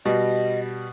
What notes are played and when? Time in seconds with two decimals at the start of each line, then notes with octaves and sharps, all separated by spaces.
0.05 B2 G3 D#5